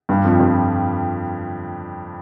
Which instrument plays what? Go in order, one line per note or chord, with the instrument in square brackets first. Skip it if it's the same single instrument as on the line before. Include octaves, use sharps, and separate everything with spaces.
[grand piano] G2 G3
F2 F3
G2 G3